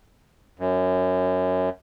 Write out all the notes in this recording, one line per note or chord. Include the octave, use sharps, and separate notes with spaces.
F#2